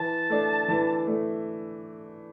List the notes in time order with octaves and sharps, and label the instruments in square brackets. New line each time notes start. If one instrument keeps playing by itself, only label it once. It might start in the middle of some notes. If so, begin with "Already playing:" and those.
Already playing: [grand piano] E3 [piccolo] A5
[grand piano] A3 D4
E3
A3 D4